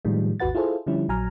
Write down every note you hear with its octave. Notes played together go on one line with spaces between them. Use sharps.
A2 D#3 F3 G3 G#3
G#1 D#2 F#4 B4 F#5 A6
E4 F4 G#4 A4 C5
D3 F3 G3 C#4 E4
A#1 F#3 G#5 A#5 F6